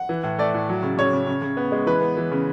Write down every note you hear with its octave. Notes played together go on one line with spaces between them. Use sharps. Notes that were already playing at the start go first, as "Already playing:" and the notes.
Already playing: F#5
E3
A2
A3 D5
A2
F#3
C#3
C#3 C#5
C#3
C#3
C#3
B3
G#3
E3 B4
B3
E3
C#3